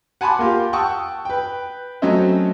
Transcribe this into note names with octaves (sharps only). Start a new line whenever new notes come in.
F#5 G#5 A5 B5 C6 D6
A#3 F4 G4
F#5 G5 A5 C#6 D#6 E6
B4 G5
F#3 A3 C4 C#4 D#5 E5